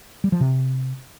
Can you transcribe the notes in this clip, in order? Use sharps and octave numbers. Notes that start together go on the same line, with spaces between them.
G3
F3
C3